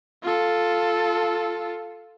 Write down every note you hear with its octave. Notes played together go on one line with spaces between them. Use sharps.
F4 A4